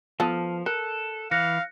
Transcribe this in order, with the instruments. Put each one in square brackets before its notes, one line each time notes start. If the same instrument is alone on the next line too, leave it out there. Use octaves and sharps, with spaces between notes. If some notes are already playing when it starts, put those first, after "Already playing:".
[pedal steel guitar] F3 [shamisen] B3 F4 A4 [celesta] A5 F6 D#7
[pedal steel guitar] A4 [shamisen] A#4 [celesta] F#6
[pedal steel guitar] E3 [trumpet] F5 [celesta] F#6 A#6 C#7